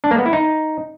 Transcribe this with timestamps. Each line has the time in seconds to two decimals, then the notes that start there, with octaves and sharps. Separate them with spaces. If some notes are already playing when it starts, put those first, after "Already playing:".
0.04 D4
0.11 A#3
0.18 B3
0.26 E4
0.33 D#4